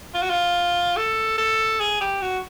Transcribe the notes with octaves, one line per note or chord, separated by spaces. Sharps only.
F4
F#4
F4
A4
A4
G#4
G4
F#4